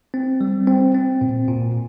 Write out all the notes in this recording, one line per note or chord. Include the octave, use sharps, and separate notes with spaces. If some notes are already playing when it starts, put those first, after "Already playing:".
C4
G3
C4
C4
A#2
A#2